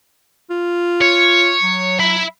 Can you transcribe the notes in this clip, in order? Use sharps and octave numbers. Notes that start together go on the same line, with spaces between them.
F4
C#5
F#3
E5 B5